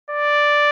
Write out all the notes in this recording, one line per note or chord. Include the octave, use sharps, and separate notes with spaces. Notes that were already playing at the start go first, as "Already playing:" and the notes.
D5